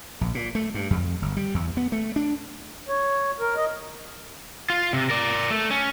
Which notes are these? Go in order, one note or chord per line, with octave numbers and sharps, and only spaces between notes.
A#1
A#2
A3
G2
F2
G1
G3
E2
B3
A3
D4
C#5
A#4
D#5
F4
C3
A#4 D5
A3
C#4